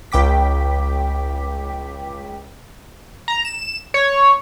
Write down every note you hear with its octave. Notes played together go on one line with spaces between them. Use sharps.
C#2 G5 D6 B6
A#5
E7
C#5